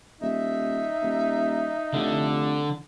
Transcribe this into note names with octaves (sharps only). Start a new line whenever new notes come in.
D#1 D#4 E5
D#1
F1 D3